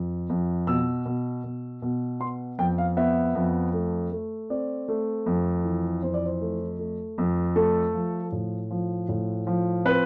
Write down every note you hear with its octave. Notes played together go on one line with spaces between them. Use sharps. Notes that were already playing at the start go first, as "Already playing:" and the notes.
Already playing: F2
F2
B2 E6
B2
B2
B2
B3 C6
F2 G5
F5
B3 E5
F2
A3
A3
C4 D5
A3
F2
E3
F2 C5
D5
C5
A3
A3
F2
A3 A4
F3
A2
F3
A2
F3
C4 B4